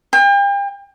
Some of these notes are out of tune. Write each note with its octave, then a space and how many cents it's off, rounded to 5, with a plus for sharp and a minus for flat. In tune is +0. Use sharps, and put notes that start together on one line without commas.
G5 +40